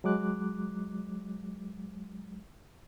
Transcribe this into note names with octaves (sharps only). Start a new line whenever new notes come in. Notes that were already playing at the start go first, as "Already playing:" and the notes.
F#3 G#3 D6 F#6